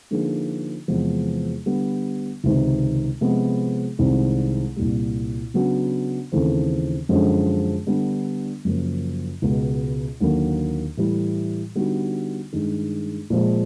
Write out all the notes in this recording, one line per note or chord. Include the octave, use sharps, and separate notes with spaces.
D3 F3 A#3 D#4 G#4
E2 C3 F3 G#3 B3
D3 G3 B3
C#2 C3 D#3
C3 F3 G#3 B3
C2 C3 D#3 G#3 C4
C2 A#2 G3
C#3 F#3 B3 D4 F#4
D#2 C#3 E3 A3 C4
F#2 D3 F3 G#3 C#4
D3 G3 B3 D4
F#2 C#3 F3 A#3
C#2 B2 G#3
D#2 D3 F#3 A#3
A2 E3 G3
D3 G3 B3 D#4 F#4
G2 D#3 G#3
A#2 F3 G#3